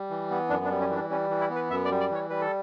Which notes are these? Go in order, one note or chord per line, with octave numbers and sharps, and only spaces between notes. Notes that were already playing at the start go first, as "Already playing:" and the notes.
Already playing: G3
E3
B3
F#2 D4
D4
G3
C#4
E3 D4
G3 C#4
E3
E4
B3
B4
F#2 E5
D5
G3
D5
E3 C#5
G3 B4
A4